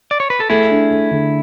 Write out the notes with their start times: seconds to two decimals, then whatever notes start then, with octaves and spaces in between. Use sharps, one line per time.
0.11 D5
0.20 C#5
0.30 B4
0.40 A4
0.50 A3 E4 G#4
0.71 D4
0.91 A3
1.11 D3